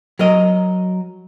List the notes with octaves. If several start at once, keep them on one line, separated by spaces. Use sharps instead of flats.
F#3 A#4 D#5